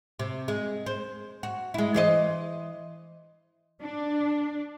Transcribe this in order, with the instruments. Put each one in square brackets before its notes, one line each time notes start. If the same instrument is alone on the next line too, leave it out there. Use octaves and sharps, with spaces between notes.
[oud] C3
G#3
C5
F#4
G#3 E4
E3 C5 D#5
[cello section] D4